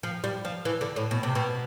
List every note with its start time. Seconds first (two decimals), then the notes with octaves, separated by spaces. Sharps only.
0.03 F3
0.24 G3
0.45 F3
0.65 E3
0.81 D3
0.96 A2
1.11 B2
1.23 C3
1.35 B2